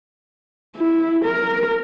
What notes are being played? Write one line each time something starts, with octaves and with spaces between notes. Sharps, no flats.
E4
A#4